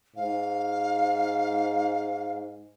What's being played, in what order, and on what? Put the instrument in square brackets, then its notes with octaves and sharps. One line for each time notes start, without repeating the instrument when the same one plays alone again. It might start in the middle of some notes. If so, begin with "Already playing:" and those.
[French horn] G#2 [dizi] F5